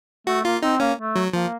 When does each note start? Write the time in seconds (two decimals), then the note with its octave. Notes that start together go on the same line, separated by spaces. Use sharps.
0.27 A3 F#4
0.44 A#3 F4
0.63 C4 D#4
0.80 A#3 C#4
0.98 A3
1.16 F#3
1.33 F3 A#3